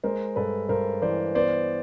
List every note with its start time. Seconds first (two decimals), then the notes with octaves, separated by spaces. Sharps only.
0.03 G#3 A#4 C5
0.36 G2 A4 B4
0.69 G2 A#4 C5
1.02 E3 C5 D5
1.35 B3 C5 D5